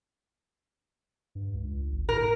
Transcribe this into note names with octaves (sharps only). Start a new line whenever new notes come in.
G2
C#2
G#1
A2 A#4